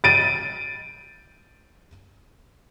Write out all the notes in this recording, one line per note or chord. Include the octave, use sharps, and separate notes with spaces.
A6 D7 D#7